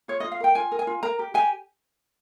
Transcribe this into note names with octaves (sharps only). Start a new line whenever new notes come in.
F4 C#5
F4 D#5
F5
A#4 G5
F4 G#5
A#4
G#5
F4
A#4 A#5
G4
G4 G#5